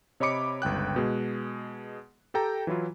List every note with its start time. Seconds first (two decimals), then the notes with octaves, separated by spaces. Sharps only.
0.20 C3 C#5 D#5 B5 D6 C#7
0.62 G1 C#2 G5 F#6
0.96 B2 G#3
2.34 G4 A4 G5 A#5
2.67 E3 F#3 E4 F4